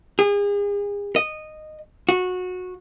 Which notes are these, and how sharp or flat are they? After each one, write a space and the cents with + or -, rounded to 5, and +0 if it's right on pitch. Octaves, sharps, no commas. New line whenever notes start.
G#4 -35
D#5 -10
F#4 -20